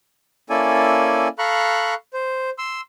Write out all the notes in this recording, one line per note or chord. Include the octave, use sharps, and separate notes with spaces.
A#3 C#4 E4 A4 D5 G#5
A4 F5 A#5 B5 C#6 F#6
C5
C6 E6